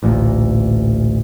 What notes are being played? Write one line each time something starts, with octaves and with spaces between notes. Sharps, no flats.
A1 D2 A#2